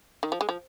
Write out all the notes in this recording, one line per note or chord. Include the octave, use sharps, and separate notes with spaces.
D#3
F3
G#3
F3